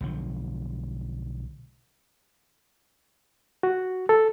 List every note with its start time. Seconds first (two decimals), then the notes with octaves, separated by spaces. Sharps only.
0.01 B1 D3 F3
3.63 F#4
4.09 A4